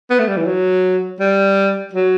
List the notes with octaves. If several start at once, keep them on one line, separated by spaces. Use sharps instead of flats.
B3
A3
G3
E3
F#3
G3
F#3